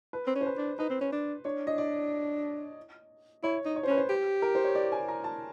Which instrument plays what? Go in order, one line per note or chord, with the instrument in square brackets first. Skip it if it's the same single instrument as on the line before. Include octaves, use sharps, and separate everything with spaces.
[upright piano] B4
[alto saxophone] C4
C#4
[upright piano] C5
B4
[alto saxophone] D4
[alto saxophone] D#4 [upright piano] B4
[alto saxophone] C4
C#4
D4
[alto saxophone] D4 [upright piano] C#5
[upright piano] D#5
D5
[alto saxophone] E4 [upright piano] C#5
[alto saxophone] D#4
[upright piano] C#5
C5
[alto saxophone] C#4 [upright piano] B4
[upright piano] C5
[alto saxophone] G4
[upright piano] A#4
C5
C#5
D5
G#5
A#5
A5